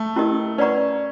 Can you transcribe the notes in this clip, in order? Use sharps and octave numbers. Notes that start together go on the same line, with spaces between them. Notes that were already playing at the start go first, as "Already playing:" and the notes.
Already playing: A3
C#4 E4 G4 A#4 D#5
C#4 B4 D5 F#5 A#5 C#6